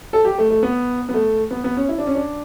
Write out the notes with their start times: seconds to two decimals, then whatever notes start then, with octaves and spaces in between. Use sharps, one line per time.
0.13 A4
0.25 G4
0.38 A3
0.50 A3
0.63 B3
1.09 B3
1.14 A3
1.51 B3
1.64 B3
1.77 C#4
1.89 E4
1.98 D4
2.07 C#4
2.15 D4